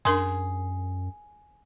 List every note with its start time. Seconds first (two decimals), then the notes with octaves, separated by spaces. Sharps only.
0.05 F#2 D4 G#4 A#4 C6